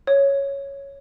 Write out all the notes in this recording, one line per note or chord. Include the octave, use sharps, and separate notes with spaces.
C#5